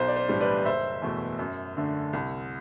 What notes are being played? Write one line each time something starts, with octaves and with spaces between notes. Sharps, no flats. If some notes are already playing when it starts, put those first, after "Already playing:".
Already playing: B1 C5
D5
C5
A2 E3 G3 D4
B4 D5
F#1 C5 E5
E2 B2 A3
F#2
D3 A3 D4
C2